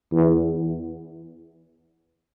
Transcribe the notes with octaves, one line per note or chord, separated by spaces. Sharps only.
E2